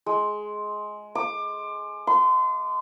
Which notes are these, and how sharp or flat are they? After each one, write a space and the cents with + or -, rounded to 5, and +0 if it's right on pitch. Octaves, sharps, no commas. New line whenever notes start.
G#3 +15
D6 +25
C6 -30